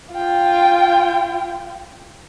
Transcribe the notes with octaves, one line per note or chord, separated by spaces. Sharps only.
F4 G5